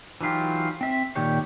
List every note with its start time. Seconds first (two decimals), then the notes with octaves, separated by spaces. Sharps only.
0.21 E3 F#3 D#4 F4 G4
0.81 C4 E5
1.15 A#2 D#3 G4 C#5